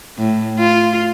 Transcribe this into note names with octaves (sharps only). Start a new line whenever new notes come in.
A2
F4